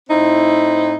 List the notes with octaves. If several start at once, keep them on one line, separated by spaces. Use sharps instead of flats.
A2 C4 D#4 E4